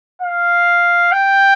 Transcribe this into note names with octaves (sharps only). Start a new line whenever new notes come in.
F5
G5